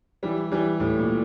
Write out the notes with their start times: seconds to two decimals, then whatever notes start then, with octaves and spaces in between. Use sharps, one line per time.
0.23 E3 G3
0.52 E3 G3
0.80 A2
0.99 A#2